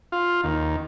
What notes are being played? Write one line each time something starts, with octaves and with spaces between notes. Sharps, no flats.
F4
D#2